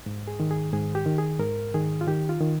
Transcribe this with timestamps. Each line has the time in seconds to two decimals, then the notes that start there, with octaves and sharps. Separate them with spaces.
0.06 G#2
0.28 G#4
0.40 D#3
0.51 G#4
0.73 G#2 G#4
0.95 G4
1.06 D#3
1.18 G#4
1.40 G#2 A#4
1.74 D#3 G#4
2.01 F4
2.07 D#3 G4
2.29 F4
2.40 D#3